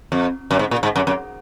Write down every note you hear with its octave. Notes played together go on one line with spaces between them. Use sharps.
F2
F#2
G#2
A#2
G#2
F#2
F#2